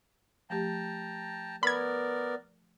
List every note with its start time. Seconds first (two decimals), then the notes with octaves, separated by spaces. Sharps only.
0.50 F3 A3 G4 G5 A5 A#5
1.63 B3 A#4 D5 B5 G#6